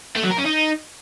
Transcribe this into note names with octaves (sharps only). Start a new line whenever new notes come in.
A3
F#3
A#4
C#4
D#4